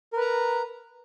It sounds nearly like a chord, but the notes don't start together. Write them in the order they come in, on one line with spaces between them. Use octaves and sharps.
A#4 B4 A#5